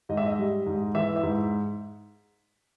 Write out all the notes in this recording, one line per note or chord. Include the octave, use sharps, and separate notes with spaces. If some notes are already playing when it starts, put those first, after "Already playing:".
G#2 D#5
E5
D#5
G3
G#2
E3 E5
E5
G#2